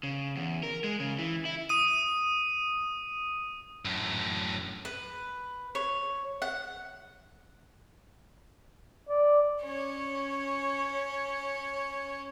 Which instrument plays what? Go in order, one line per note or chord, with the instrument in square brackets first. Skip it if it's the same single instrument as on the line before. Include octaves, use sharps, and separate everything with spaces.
[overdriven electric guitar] C#3
E2
A#4
G#3
C#3
E3
E4
[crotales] D#6 D#7
[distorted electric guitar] F#2 A2
[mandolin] B4
C#5
F#5
[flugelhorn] D5
[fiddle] C#4 C#5